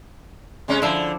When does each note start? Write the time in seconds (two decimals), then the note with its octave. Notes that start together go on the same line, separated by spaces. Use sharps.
0.68 C3 G#3 C#4
0.82 D3 F3 E4